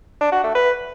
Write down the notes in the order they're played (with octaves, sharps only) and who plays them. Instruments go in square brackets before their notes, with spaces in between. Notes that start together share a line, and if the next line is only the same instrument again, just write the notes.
[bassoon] D4
F#4
A3
B4